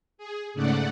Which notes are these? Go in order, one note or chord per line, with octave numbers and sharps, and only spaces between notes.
G#4
G#2 C#3 A3 D5 F#5